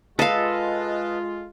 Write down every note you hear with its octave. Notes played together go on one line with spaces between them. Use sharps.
G#3 F4 A4 B4 D#5 F5 A5